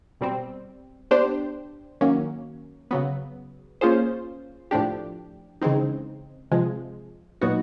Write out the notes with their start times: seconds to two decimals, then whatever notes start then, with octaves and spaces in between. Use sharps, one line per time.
0.21 B2 G3 C4
1.11 B3 D4 G4 C5
2.01 D#3 F#3 A#3 C#4
2.91 C#3 F#3 B3
3.81 A#3 C#4 F4 G#4 C5
4.71 A2 F3 A3 D4 G4
5.61 C#3 E3 G#3 C4 D#4
6.51 C3 F3 G#3
7.41 A#2 F#3 B3 D#4 F#4